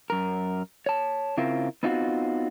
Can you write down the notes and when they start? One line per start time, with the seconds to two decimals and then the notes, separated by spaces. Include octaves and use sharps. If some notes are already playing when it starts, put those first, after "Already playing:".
0.10 F#2 A#4
0.86 C#5 A5
1.37 C#3 C4 E4 F4 A#4
1.83 B3 C4 D#4 F4 F#4